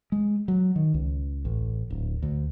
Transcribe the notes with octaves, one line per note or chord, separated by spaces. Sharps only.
G#3
F#3
D#3
C#2
A1
D1
D2